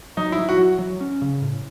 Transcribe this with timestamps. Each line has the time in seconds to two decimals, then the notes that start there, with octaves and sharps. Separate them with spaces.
0.17 F#3 D#4
0.32 E4
0.38 F#3
0.49 F#4
0.58 F#3
0.79 F#3
1.01 C#4
1.22 C#3
1.42 A2